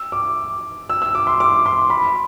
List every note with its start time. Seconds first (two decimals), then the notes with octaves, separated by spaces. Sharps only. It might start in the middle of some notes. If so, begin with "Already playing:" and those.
Already playing: E6
0.12 D6
0.89 E6
1.02 E6
1.15 D6
1.27 C6
1.40 D6
1.66 C6
1.90 B5